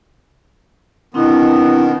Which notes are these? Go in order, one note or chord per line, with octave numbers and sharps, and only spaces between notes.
B2 D#3 B3 C4 D4 E4